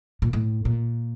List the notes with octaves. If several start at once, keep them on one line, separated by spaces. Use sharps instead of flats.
A#2
A2
A#2